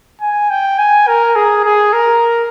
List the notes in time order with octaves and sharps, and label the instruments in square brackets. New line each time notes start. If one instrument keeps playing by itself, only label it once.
[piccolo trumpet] G#5
G5
G#5
A#4
G#4
G#4
A#4